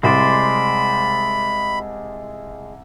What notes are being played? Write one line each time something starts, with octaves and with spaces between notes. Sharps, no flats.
C2 G#3 C5 D5 B5